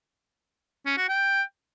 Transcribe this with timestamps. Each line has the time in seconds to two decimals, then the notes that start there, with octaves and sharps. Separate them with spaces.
0.86 C#4
0.98 F#4
1.09 G5